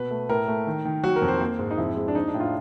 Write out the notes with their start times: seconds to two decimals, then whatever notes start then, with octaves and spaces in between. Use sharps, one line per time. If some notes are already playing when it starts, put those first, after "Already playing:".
Already playing: B2 B4
0.11 A3
0.29 A2 A#4
0.48 A3
0.67 D#3
0.85 D#3
1.03 F#3 F#4
1.16 A#4
1.22 F2
1.28 C5
1.41 A#3
1.59 G#2
1.71 D#4
1.78 F2 E4
1.97 G#3
2.08 D4
2.15 F3 D#4
2.28 D4
2.34 A2
2.40 F4